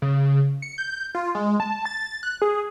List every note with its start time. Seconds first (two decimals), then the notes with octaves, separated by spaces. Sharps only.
0.02 C#3
0.62 C#7
0.78 G6
1.15 F4
1.35 G#3
1.60 A5
1.85 A6
2.23 F#6
2.42 G#4